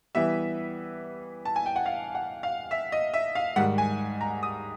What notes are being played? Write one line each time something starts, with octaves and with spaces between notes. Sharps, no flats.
E3 G3 B3 E5
A5
G#5
G5
F#5
F5
F#5
F5
E5
D#5
E5
F5
G#2 D#3 G3 F#5
G#5
A#5
D#6